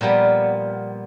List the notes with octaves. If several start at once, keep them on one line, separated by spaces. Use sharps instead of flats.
A#2 F3 G3 B3